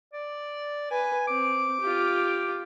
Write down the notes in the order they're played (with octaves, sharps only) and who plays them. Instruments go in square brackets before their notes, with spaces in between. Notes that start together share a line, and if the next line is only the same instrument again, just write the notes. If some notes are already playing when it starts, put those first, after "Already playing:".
[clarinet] D5
[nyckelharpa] B4 [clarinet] G#5
[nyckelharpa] C4 [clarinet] D6
[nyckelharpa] F4 G4